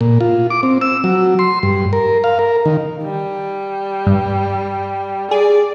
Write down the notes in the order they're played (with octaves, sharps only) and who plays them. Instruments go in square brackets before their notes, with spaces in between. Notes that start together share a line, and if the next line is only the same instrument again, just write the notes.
[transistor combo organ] A#2
F4
D6
C4
E6
F#3
C6
G2
A#4
F5
A#4
D#3
[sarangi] G3
[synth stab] G2
[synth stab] G#4 [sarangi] D5